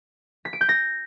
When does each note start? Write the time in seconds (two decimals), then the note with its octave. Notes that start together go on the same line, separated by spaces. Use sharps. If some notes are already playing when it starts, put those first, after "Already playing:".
0.45 B6
0.53 D7
0.61 G6
0.69 A#6